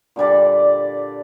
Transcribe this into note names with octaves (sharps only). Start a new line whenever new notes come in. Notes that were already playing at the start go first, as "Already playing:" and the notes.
A#2 D3 G3 D5